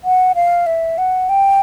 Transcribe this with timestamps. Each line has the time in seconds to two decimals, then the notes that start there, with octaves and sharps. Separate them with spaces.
0.04 F#5
0.35 F5
0.66 E5
0.98 F#5
1.29 G5